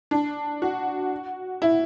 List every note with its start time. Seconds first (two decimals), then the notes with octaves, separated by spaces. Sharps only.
0.11 D4
0.62 F#4
1.62 E4